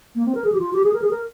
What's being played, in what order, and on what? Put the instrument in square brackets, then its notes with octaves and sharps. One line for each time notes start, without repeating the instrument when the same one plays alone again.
[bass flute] A#3
C4
A#4
G#4
G4
F4
G4
G#4
A#4
G#4
A#4